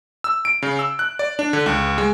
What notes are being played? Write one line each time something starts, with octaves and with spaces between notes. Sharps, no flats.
E6
D7
C#3
E6
F#6
D5
D4
D3
C#2
G#3